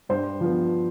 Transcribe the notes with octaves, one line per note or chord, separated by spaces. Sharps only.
G2 C5
F3 B3